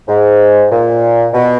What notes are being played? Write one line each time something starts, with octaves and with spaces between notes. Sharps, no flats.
G#2
A#2
B2